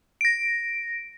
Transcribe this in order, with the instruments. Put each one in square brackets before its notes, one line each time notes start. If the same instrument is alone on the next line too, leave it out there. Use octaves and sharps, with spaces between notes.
[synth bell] A#6 D7